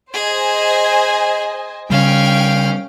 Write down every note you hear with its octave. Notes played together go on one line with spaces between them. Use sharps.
G#4 C5 D#5 G#5
C#3 G3 C#4 F5 G5